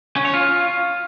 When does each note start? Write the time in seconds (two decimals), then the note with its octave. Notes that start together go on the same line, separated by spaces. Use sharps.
0.16 C#4
0.25 C#5
0.34 F4